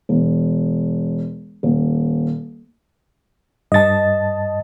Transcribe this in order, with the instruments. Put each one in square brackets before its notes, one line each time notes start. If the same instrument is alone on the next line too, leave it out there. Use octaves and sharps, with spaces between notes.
[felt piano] E1
D#1
[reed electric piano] G2 A6 [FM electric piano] D#5 A5